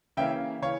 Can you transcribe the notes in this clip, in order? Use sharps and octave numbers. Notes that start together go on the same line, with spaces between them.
C#3 E3 A#3 C#4 E5 G5
C#3 E3 C#5 F5